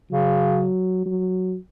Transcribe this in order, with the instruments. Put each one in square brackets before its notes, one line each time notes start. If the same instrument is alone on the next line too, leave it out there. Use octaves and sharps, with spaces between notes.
[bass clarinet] C#3 [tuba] F#3
[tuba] F#3